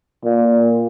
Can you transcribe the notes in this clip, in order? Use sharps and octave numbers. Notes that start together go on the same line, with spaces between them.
A#2